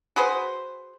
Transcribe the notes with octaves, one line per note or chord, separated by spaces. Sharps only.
F#4 G#4 B4 C5